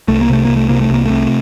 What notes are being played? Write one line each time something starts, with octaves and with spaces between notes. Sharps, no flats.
C2 A3
A#3
C3 A3
C2 A#3
A3
C3 A#3
A3
C2 A#3
C3 A3